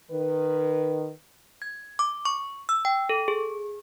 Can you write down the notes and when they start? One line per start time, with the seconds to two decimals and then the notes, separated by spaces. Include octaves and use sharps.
0.11 D#3 B4
1.62 G#6
1.99 D6
2.25 C#6
2.69 E6
2.85 G5
3.09 A4
3.28 G#4